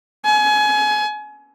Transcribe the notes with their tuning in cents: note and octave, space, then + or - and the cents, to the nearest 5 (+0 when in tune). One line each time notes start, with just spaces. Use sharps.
G#5 +30